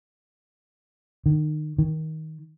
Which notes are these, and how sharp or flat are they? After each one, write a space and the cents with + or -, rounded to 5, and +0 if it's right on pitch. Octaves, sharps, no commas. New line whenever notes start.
D#3 -30
D#3 +20